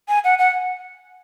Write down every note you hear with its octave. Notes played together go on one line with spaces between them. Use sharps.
G#5
F#5
F#5